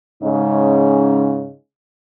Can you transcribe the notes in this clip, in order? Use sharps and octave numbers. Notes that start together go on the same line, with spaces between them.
G#2 C#3 G#3 C#4 D#4